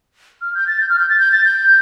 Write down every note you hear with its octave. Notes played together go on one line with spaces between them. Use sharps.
F6
G6
A6
G6
F6
G6
A6
G6
A6
G6